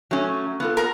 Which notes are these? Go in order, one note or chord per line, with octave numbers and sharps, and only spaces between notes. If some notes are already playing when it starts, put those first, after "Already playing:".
F#3 A3 C#4
B3 F4 A4
A#4 A#5